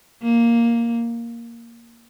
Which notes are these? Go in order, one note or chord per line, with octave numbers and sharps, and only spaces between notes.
A#3